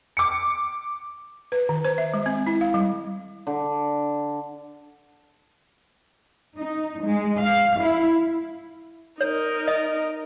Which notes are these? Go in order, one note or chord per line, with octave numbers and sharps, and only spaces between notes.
D6 C#7
B4
D#3
C5
E5
G#3
C4
E4
F5
G3
D3
D#4
G#3
F5
E4
D#4 A#4 C#5
D#5